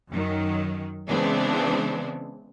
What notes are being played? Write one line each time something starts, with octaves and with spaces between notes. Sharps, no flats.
F#2 D#3 F#3
C#3 E3 G#3 B3 C4 D4